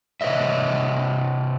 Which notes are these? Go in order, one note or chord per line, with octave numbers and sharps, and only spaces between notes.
C3 B4 C#5 D#5 E5